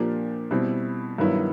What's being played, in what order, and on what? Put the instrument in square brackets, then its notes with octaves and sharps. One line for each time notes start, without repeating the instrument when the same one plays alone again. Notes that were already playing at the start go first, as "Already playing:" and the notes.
Already playing: [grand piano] A#2 F3 A#3 D4 G4
B2 G3 C4 E4
G2 D#3 F#3 B3 E4